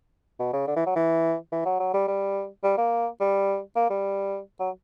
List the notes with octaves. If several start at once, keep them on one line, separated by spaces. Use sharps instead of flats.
B2
C#3
D3
E3
F#3
E3
E3
F#3
F#3
G3
G3
G3
A#3
G3
A#3
G3
F#3